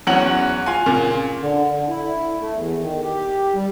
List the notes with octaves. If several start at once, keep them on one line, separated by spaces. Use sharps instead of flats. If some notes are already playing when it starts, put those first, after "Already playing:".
E2 F#3 C#4 F#5 F#7
F4 F5 G#5
A#2 C#3
D3
D3
E4
A3
E2
D#3
G4
G3